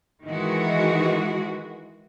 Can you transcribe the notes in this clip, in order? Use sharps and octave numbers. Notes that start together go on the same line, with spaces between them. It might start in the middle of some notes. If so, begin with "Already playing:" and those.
D#3 E3 G#3 F#4